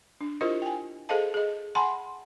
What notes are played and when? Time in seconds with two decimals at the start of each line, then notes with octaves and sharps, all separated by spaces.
0.21 D4
0.41 E4 F4 G4 A#4 C5 D#5
0.62 G5 G#5
1.09 G#4 A4 C5 D#5 F5 A5
1.34 G#4 D#5
1.75 F#5 G#5 A5 B5 C6